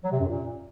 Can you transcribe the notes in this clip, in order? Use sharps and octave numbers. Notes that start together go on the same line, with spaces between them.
F#3
C3
F#2
A#2